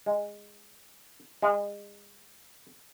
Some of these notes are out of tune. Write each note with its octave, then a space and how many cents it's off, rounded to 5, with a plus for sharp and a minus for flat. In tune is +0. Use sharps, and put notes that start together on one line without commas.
G#3 -10
G#3 -30